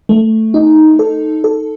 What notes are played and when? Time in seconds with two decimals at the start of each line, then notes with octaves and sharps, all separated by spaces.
0.09 A3
0.54 D#4
0.99 A4
1.44 A4